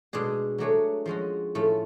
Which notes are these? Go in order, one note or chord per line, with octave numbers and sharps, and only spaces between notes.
B2 G#3 D4 G#4
F#3 A3 D4 G#4 C#5
F3 G#3 C#4 F#4
A2 F3 A3 C#4